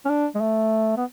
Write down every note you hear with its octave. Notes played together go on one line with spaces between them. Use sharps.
C#4
D4
G#3
A3
B3